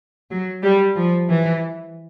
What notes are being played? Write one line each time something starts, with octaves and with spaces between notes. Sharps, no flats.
F#3
G3
F3
E3